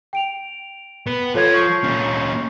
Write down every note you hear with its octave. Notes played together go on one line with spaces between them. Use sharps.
G5 D7 F7
B3
F3 A4 C#5 G#6
C#6 G6 C7
A#2 C#4